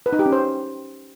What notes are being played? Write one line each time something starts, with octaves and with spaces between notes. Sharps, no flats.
B4
D#4
G4
C#4
C5